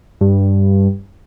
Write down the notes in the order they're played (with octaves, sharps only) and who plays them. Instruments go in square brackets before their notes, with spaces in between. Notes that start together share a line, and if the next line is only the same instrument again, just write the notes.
[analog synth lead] G2